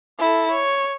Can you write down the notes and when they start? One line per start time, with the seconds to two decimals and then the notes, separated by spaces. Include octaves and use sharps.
0.18 E4 A4
0.51 C#5